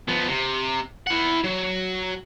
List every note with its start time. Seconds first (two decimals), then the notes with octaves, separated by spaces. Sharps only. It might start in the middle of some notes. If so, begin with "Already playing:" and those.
0.08 F3 B3
0.28 C3
1.07 E4 F#5
1.44 F#3